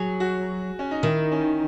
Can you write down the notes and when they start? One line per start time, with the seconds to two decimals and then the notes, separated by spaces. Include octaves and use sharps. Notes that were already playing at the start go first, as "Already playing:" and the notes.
Already playing: F#3 G#4
0.20 F#4
0.79 C#4
0.91 D#4
1.03 D#3 E4
1.32 C#4